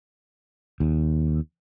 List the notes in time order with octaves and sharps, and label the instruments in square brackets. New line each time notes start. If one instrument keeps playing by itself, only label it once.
[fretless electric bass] D#2